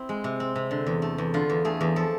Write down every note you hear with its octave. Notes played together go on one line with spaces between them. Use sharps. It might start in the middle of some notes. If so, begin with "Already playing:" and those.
Already playing: C4 E4
G#3
C3
C4
C3
D3
E2
A3
E2
D3 F4
E2
A3 G#4
E2
F3 A4